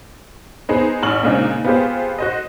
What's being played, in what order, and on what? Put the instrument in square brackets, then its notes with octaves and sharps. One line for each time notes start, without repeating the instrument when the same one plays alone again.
[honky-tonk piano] B3 C4 D#4 G#4 C5
A1 C#6 F6 F#7
A#2 C#3 G#3 C4 D4 D#4
B3 C4 F4 G4 G#4 C5
F#4 C5 D#5